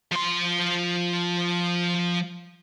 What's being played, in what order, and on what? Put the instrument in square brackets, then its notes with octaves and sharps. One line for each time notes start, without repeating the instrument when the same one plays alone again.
[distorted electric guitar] F3 C6